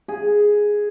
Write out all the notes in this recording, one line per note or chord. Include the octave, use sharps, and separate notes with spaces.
G#4